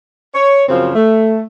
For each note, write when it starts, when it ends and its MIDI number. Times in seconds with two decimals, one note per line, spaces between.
0.34 0.64 73
0.69 0.91 42
0.69 0.91 49
0.69 0.91 53
0.69 0.91 60
0.69 0.91 61
0.95 1.42 57